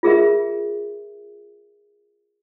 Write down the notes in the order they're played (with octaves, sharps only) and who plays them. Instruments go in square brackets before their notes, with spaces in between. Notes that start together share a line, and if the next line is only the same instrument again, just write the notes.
[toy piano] F4 G#4 A#4 E5